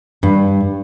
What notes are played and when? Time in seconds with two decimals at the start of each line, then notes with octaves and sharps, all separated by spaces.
0.23 G2